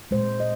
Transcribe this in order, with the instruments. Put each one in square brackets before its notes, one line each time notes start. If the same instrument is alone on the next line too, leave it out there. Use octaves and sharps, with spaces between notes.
[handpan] A#2 G#3 C5
D#5